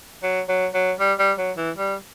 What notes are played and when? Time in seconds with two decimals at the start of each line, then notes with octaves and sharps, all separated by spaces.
0.23 F#3
0.49 F#3
0.74 F#3
1.00 G3
1.19 G3
1.38 F#3
1.57 E3
1.77 G3